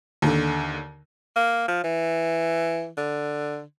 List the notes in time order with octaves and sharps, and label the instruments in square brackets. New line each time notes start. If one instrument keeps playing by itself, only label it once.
[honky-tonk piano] D#2 D3
[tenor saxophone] A#3
F3
E3
D3